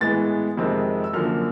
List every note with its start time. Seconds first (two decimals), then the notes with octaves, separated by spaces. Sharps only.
0.01 A2 E3 G#3 B3 A6
0.57 F2 C3 D#3 G#3 C4
1.04 E6
1.13 F#2 D3 F3 A#3 F6